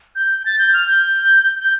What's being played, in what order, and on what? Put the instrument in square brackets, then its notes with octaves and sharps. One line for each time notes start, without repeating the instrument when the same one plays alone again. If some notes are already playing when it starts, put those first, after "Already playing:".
[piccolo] G6
A6
G6
F6
G6
G6